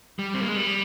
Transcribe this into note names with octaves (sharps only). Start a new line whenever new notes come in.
G3
C4
A#3
G#3
G3